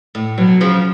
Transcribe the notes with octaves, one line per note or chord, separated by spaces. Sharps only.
A2
B2 F#3
C#3 F3